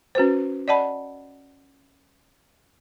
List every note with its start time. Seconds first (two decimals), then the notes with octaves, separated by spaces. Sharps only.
0.15 C#4 F#4 B4 C5
0.68 D5 D#5 F#5 A5 B5